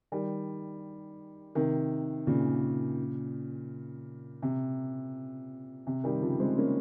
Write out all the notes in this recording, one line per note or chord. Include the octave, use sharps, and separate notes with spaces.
D#3 G3
C3 D#3
A#2 C#3
C3
C3
D#3 G3
C#3 F3
G#3 C4
A#3 C#4